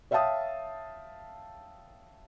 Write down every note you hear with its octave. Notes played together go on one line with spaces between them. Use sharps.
C#5 E5 F5 G5 A5 D#6